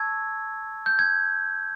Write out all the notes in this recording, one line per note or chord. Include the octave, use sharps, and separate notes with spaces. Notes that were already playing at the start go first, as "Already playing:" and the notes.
Already playing: A5 C#6 E6 G#6
G6
G#6